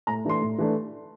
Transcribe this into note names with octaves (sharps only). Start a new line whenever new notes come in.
A2 A#5
E3 A3 D4 C6
A2
E3 A3 D4